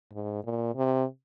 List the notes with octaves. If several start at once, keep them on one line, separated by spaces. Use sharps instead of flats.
G#2
A#2
C3